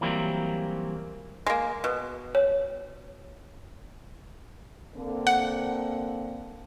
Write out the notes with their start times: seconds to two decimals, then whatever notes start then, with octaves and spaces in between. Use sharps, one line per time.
0.01 E3 F#3 G3 A#3 C4
1.46 G#3 A#3
1.84 B2
2.35 C#5
4.95 D3 A#3 C4
5.27 F#5